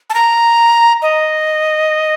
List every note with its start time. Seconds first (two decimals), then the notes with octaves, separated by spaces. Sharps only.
0.10 A5
0.14 A#5
1.02 D#5